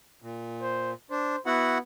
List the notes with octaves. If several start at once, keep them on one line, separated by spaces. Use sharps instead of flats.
A#2
C5
D4 C5
B3 E4 F#4 F#5